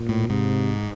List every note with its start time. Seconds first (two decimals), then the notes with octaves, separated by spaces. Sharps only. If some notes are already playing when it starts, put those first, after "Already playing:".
Already playing: A#2
0.09 A2
0.30 G#2 C3